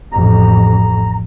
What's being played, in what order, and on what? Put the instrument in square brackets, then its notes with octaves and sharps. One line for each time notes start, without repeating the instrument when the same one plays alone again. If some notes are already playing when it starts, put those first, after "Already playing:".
[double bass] A1 F2 [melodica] A#5